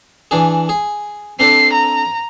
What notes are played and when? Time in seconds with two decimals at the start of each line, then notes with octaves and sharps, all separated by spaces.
0.31 E3 D4 G#4
0.69 G#4
1.40 C4 D4 A4 C7
1.73 A#5